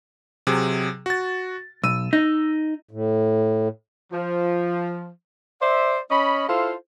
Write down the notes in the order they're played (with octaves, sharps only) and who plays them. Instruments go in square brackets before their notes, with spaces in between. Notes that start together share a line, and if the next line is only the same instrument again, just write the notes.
[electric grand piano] C3 F#3 G#4
F#4 A6
[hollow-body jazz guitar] B1 [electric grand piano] E6 D#7
[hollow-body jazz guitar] D#4
[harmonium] A2
[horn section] F3
C5 D5 E5
C#4 D#5 B5
E4 F4 A4 C5 F5 C6